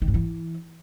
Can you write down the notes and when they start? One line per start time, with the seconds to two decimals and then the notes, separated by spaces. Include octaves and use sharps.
0.02 D#3
0.08 G#2
0.14 E3